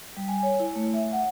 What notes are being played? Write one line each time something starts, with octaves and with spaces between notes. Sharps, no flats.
G3
G#5
C#5
E4
A3
E5
F#5